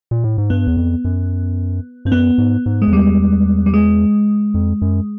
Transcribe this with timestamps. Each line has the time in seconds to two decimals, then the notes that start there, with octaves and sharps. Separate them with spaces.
0.11 A#2
0.24 A2
0.38 G#2
0.50 G2 B3
0.67 E2
0.77 F2
1.05 F#2
2.05 G2 C4
2.12 F#2 B3
2.38 G#2
2.66 G#2
2.82 G#3
2.87 F2
2.92 E2 G3
3.66 G3
3.74 G#3
4.54 F2
4.82 F#2